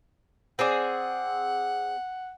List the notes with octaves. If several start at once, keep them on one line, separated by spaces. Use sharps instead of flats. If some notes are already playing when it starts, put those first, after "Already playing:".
C4 G#4 D5 F#5